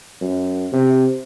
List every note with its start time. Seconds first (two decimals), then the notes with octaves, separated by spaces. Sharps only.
0.21 F#2
0.72 C3